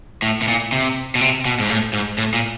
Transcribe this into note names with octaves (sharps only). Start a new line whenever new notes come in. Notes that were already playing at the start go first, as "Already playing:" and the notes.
A2
A2
A#2
C3
B2
C3
B2
G#2
A2
G#2
A2
A#2